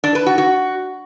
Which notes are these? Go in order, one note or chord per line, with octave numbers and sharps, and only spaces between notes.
D4
B4
F#4
F#4